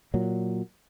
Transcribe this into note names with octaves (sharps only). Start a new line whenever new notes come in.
A#2 F#3